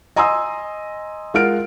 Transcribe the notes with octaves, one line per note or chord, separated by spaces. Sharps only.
D#5 G#5 A#5 C6 D#6 E6
G#3 F4 A#4 F#5 F6 D7